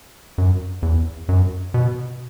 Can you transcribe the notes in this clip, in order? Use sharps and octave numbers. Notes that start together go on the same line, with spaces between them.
F#2
E2
F#2
B2